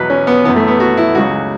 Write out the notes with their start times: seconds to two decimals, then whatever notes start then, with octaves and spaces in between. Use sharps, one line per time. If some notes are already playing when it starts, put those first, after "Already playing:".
Already playing: E2 B2 F#3 B4
0.10 C#4
0.27 B3
0.45 E3 B3
0.48 F#2
0.56 A3
0.68 B3
0.80 F#4
0.97 E4
1.15 C#2 C#3 F#3 F#4